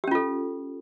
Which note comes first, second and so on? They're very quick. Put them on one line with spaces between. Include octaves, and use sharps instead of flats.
G4 C#4 F4 A4